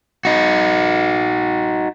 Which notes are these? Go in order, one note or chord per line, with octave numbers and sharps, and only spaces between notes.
D#4 F#4